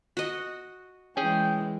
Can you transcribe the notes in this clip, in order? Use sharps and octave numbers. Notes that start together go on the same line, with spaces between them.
F#4 D#5
E3 G#3 C#4 G#4 G5